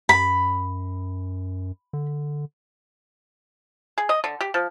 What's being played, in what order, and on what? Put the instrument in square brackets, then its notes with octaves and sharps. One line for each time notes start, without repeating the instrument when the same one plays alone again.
[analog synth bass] F#2 [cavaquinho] B5
[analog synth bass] D3
[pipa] G#4
D#5
D3
G4
F3